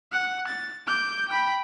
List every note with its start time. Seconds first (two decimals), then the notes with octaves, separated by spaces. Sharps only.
0.12 F#5
0.47 A6
0.87 D6 G6
1.29 G5 B5